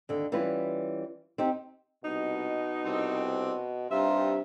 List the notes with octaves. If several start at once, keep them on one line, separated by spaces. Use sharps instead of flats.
D#2 D3
E3 G3 C#4 F4 B4
C4 D#4 G4
C2 B2 D#4
C2 C4 D4
G2 C3 D#4 F4 E5